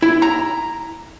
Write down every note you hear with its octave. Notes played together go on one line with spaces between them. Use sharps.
E4
A#5